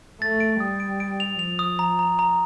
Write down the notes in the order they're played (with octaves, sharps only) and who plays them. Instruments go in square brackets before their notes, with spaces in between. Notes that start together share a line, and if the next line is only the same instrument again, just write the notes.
[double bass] A3 [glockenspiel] A6
[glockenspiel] D7
[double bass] G3 [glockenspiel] D#6
[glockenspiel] D7
D7
F7
[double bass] F3 [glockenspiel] F7
[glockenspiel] D#6
A#5
A#5
A#5